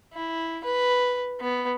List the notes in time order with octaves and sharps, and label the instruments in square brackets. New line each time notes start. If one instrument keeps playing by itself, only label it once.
[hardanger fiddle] E4
B4
B3